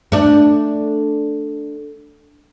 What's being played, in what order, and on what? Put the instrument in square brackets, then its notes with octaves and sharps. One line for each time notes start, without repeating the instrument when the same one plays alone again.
[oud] A3 D4